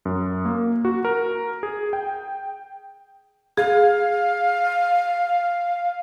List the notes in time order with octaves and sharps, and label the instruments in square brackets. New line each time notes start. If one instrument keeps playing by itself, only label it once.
[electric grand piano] F#2
A#3
F#4
A#4
G#4
G5
[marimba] G#4 [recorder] F5